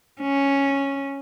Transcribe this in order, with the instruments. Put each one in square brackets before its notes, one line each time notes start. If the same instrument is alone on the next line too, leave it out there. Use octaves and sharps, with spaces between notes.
[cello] C#4